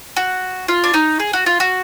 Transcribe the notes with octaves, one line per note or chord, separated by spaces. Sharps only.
F#4
F4
D4
D#4
G#4
F#4
F4
F#4